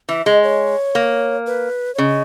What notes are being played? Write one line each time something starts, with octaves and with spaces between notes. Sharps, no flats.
E3 E5
G#3 D#5
C#5
A#3
B4
C#5
C#3 D#5